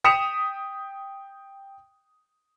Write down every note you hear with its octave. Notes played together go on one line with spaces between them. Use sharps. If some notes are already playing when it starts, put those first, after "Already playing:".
G5 D#6 B6 C#7 E7 F7